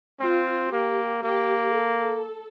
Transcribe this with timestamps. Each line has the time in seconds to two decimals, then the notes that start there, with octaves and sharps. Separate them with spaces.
0.20 C4 F4
0.72 A#3 G4
1.23 A#3 G4
1.74 A4